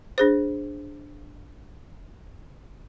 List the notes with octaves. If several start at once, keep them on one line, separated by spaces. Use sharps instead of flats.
D4 G#4 C5